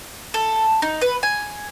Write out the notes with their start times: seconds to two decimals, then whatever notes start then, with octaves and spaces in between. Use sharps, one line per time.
0.34 A4
0.82 D#4
1.01 B4
1.23 G#5